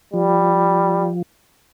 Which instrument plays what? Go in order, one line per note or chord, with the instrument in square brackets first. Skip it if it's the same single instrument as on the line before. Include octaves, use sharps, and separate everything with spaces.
[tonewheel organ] F3 [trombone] G3